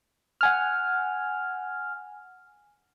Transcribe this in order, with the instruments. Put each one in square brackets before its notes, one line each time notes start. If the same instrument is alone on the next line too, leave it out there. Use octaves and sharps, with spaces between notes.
[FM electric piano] F#5 G#5 F6